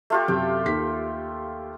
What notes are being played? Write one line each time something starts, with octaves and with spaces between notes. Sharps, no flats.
A3 F4 G4
F#2 C3 G5
D#2 B6